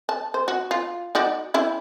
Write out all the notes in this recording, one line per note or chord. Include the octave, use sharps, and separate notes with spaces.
A5
C5
F#4
F4
D#4 F#4 D5
C#4 E4 G4